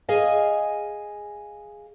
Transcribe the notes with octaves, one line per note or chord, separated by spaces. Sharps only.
G#4 D#5 F5 G#5